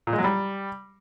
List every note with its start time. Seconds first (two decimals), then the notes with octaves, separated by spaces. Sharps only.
0.07 A#2
0.13 G#3
0.18 F#3
0.24 G3